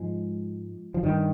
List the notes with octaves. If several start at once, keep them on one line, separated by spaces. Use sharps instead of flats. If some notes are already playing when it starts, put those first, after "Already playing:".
Already playing: G#2 F3 G#3
F3
G2 D#3 G3